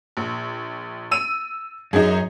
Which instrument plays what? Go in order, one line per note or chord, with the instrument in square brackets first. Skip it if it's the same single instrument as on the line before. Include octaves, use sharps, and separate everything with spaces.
[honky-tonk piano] A#1
E6 D#7
[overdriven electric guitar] F#2 [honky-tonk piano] D#4 G#4